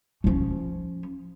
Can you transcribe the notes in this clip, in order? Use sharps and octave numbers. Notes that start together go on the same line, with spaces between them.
F3 C#4